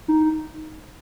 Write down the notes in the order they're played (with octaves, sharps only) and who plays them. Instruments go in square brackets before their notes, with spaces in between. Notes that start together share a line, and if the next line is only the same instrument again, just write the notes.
[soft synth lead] D#4